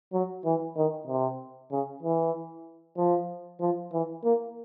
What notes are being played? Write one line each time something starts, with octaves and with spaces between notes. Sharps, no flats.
F#3
E3
D#3
C3
C#3
E3
F3
F3
E3
A#3